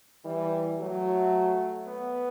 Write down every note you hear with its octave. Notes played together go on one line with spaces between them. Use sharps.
E3 G3
F#3 A3
B3